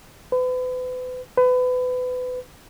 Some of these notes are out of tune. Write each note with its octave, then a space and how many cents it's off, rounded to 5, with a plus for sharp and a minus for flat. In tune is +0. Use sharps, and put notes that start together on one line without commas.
B4 +40
B4 +30